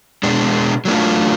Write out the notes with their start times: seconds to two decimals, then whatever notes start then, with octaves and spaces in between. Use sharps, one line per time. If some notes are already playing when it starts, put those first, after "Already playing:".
0.23 B2 G#3 D4
0.85 F#3 A3 D4 F4